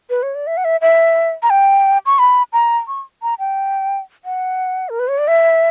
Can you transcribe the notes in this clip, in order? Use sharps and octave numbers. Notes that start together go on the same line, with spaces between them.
B4
C#5
D5
E5
F#5
E5
E5
A#5
G5
C#6
B5
A#5
C#6
A#5
G5
F#5
A#4
B4
C#5
D5
E5